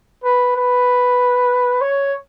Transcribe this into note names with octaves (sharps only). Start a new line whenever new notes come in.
B4
B4
C#5